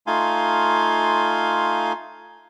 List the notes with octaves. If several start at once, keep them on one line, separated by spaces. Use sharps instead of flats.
A3 D#4 F4 F5 G#5 C6